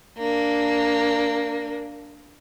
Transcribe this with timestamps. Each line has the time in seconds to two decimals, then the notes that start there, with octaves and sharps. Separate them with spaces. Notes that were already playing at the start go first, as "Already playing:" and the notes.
0.18 A#3 D4